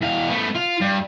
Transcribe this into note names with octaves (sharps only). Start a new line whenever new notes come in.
E2 F5
A3 B3
F4
G2